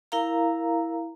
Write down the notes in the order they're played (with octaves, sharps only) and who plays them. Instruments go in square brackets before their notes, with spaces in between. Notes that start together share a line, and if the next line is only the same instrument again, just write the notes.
[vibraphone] E4 A#4 F5 A#5